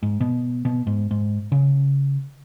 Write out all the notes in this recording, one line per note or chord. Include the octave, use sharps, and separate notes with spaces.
G#2
B2
B2
G#2
G#2
C#3